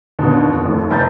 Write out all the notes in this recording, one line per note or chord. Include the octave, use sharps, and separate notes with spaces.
D#2 B2 D3
D4
F2
D#2 A2
F1 B5 G6 A6